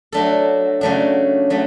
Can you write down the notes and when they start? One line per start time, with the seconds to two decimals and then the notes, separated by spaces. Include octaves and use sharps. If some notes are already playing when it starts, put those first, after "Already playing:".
0.12 F#3 A3 D4 A4
0.81 C#3 F#3 A3 D4
1.50 F#3 A3